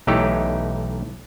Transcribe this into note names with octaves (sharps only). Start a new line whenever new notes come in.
B1 E3 A3 D#4 G4 C#5